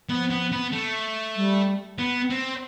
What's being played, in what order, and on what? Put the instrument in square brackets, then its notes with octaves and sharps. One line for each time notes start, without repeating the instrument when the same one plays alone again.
[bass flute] F3 [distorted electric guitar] B3
[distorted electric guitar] B3
B3
A3
[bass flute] G3
[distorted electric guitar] B3
C4